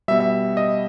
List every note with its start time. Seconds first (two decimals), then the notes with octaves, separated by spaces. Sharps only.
0.08 B2 G3 E5
0.20 E5
0.57 D#5